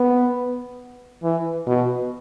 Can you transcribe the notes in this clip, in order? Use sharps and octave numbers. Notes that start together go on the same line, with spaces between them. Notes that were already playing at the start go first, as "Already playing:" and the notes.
Already playing: B3
E3
B2